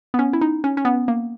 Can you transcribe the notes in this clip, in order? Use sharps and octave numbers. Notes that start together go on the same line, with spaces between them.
B3
C#4
E4
D#4
C#4
C#4
B3
A#3